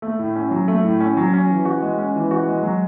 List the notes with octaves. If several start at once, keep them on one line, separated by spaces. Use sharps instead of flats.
A3
A2
C#4
F#3
A3
A2
C#4
F#3
C#4
E3
F#4
G#3
C#4
E3
F#4
G#3
F#3